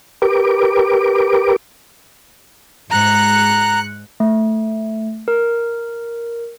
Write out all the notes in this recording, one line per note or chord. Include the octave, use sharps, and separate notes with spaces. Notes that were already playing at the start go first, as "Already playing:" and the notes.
G4 A#4 B4 D6
G#2 A#5 F#6 C#7
A3
A#4